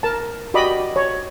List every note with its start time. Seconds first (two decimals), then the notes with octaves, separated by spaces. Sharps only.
0.03 A#4 A5
0.54 F#4 G4 D5 D#5 B5 D6
0.96 C#5